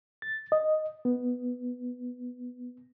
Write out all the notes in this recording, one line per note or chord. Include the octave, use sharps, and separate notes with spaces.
A6
D#5
B3